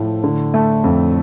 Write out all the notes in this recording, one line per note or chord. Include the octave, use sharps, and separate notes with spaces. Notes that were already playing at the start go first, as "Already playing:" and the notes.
Already playing: A2 F3 A3
D3
A3
F2